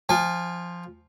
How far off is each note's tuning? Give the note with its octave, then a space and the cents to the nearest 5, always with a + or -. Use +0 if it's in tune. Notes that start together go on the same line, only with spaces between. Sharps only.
F3 +0 G#5 -40